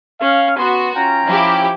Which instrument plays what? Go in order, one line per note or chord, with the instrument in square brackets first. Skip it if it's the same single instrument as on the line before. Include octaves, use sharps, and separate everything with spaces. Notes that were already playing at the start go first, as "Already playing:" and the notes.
[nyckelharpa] C#4 [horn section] F5
[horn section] B3 [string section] F#4 [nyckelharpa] C6
[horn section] C#4 F4 G5 [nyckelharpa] A#5
[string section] F3 E4 G4